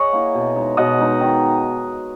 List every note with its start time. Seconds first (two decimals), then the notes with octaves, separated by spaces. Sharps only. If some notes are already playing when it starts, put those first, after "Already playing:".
Already playing: G#4 C#5 D#5 F#5
0.13 A#3 E4
0.34 B2
0.56 G#3 D#4
0.77 B2 D#5 F#5
0.99 G#3 D#4
1.20 D#3